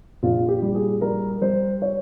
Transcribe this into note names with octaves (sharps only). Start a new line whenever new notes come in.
A#1 F4
G4
G3
G#4
G3 A#4
G3 C5
C#5